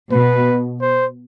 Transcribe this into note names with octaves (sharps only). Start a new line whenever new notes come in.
B2 B4
C5